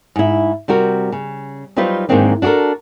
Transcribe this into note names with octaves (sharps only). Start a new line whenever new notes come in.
G#2 E4
C3 G3 F#4 A#4
C#3
F#3 G3 D#4 F4 B4 C5
G#2 D#3 E3 A#3 C4 D4
D4 F#4 G4 A4 A#4